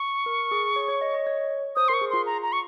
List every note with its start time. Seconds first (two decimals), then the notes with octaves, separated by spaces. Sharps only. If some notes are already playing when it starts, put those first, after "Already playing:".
Already playing: C#6
0.26 A#4
0.51 G#4
0.76 C#5
0.88 C#5
1.01 D#5
1.14 D#5
1.27 C#5
1.76 C5 D#6
1.88 A#4 C6
1.94 C#6
2.01 G#4
2.10 F4 C6
2.26 A#5
2.43 A#5
2.53 C#6